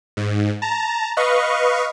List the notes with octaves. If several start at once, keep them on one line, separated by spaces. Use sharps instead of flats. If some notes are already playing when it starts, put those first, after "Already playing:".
G#2
A5 A#5
B4 D#5 F5 C#6